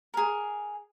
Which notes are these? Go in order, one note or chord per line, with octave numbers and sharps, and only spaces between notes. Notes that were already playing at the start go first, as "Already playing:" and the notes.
G#4 A#4